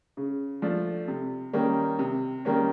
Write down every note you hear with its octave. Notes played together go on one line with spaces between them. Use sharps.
C#3
F3 A3 D4
C3
D#3 G3 A#3 C#4
C3
D#3 G3 A#3 C#4